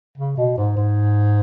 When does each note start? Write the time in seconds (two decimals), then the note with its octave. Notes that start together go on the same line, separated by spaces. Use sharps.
0.18 C#3
0.37 B2
0.57 G#2
0.77 G#2